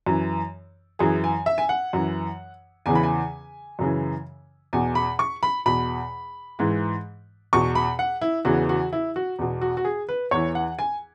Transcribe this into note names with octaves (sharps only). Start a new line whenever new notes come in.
F#2 E3
F#2 E3 G#4
G#5
E5
G#5
F#5
F#2 E3
E2 C#3 E3 G#5
B5
G#5
F#2 C#3 E3
E2 B2 G#5
B5
C#6
B5
E2 B2 B5
G#2 E3
E2 B2 C#6
B5
F#5
E4
E2 C#3 E3 F#4
F#4
E4
F#4
E2 B2
F#4
F#4
G#4
B4
E2 E3 C#5
F#5
G#5